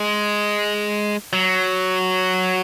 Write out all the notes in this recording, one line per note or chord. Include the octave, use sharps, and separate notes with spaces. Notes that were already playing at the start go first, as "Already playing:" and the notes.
Already playing: G#3
F#3